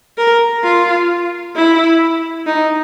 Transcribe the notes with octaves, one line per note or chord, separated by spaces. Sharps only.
A#4
F4
E4
D#4